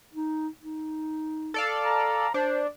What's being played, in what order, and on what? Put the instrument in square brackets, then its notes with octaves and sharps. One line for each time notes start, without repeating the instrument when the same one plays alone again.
[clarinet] D#4
D#4
[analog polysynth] A4 D5 F5
[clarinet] A#5
[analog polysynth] D4 [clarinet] C5